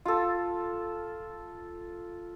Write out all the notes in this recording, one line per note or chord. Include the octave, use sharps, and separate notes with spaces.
F4 A4